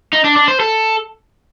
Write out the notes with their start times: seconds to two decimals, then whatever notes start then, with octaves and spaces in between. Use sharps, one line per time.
0.13 D#4
0.25 D4
0.36 D4
0.48 C5
0.60 A4